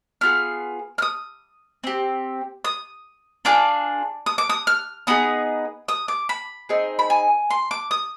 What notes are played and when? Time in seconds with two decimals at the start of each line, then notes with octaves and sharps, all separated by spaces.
0.21 B3 F4 G#4 F6
0.98 F6
1.02 D#6
1.84 C4 G4
2.65 D#6
3.45 D4 F4 G#4 D6
4.26 D#6
4.38 D6
4.49 D#6
4.67 F6
5.07 B3 D#4 G#4 D#6
5.88 D#6
6.08 D6
6.29 B5
6.69 C4 D#4 G#4
6.99 B5
7.10 G#5
7.50 C6
7.71 D6
7.91 D#6